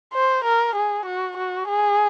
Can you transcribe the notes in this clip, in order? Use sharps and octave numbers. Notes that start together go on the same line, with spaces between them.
C5
A#4
G#4
F#4
F#4
G#4